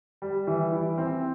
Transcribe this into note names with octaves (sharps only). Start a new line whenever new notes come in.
G3
E3
E4
C4